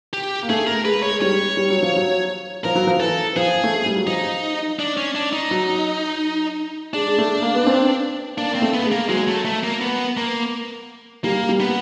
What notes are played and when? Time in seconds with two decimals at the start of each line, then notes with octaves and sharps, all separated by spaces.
0.13 G4
0.43 A#3
0.49 A3 G#4
0.67 A#4
0.85 G#3 B4
1.03 C#5
1.11 G#3
1.21 G3 C#5
1.57 G3
1.70 F#3
1.83 F3
1.96 F#3
2.64 F3 A#4
2.75 F#3
2.87 F3
3.00 E3 A4
3.36 F3 G#4
3.64 A3
3.74 G#3
3.86 G3
3.96 F#3
4.07 F3 D#4
4.79 D4
4.98 C#4
5.15 D4
5.33 D#4
5.51 F#3
6.94 G#3 D4
7.07 G#3
7.18 A3
7.42 A#3
7.55 B3
7.67 C4
8.37 A#3 D4
8.51 A#3 C4
8.62 A3
8.74 B3
8.85 G#3
8.91 A#3
9.09 F#3 G#3
9.28 A3
9.45 A3
9.64 A#3
9.81 B3
10.17 A#3
11.24 G3 A#3
11.49 G3
11.60 B3